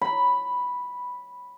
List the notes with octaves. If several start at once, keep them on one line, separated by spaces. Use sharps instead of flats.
B5